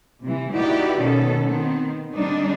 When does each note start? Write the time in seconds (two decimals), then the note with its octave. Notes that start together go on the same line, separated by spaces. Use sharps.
0.23 C3 E3
0.53 D#4 E4 F#4 G4 B4 D5
0.99 B2 D#3 B3 C#4 A4
1.44 D#3 B3 C4
2.13 D3 G3 C4 D4 D#4